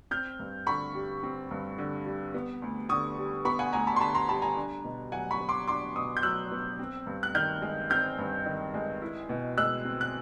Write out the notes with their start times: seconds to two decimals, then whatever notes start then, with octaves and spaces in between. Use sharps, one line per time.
0.11 C4 F6 G6
0.39 G2
0.67 D3 B5 C#6
0.95 G3
1.23 C4
1.51 G2
1.78 D3
2.06 G3
2.34 B3
2.62 D2
2.89 D3 C#6 D#6
3.18 G3
3.45 B3 B5 C#6
3.59 F#5 G#5
3.73 D2 G#5 A#5
3.87 A5 B5
3.96 C6
4.01 D3 A5 B5
4.15 A#5 C6
4.29 G3 A5 B5
4.42 G#5 A#5
4.57 D4
4.84 B2
5.12 F#3 F#5 G#5
5.31 B5 C#6
5.40 B3
5.49 C6 D6
5.68 D4 C6 D6
5.96 B2 C#6 D#6
6.17 G6
6.23 F#3 E6 F#6
6.51 B3
6.79 C4
7.07 G2
7.23 F#6
7.34 D#3 F6 G6
7.62 G#3
7.90 C4 F6 G6
8.18 G2
8.46 D#3
8.74 G#3
9.02 E4
9.29 B2
9.57 G#3 E6 F#6
9.85 C4
10.01 F#6